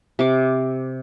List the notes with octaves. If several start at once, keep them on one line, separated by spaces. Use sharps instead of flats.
C3 D6